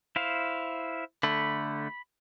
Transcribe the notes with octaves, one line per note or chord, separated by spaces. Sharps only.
E4 C5 F5
D3 A3 B5